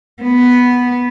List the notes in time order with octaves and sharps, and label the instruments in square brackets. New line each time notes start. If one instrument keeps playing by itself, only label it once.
[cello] B3